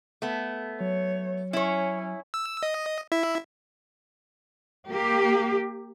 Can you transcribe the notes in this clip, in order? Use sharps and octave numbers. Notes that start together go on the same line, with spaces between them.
A3 B3
F#3 C#5
C#4 E4 C#5
E6
D#5
E4 E5
A#3 G4